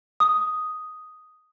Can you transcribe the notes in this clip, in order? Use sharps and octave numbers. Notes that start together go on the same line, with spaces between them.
D#6